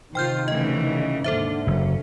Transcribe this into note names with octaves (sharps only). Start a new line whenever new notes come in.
C3 D#3 F4 C5 G5 F6 G6
D2 C#3 E3 D#5
D#2 G#2 D3 A4 C5 E5
F#1 C#4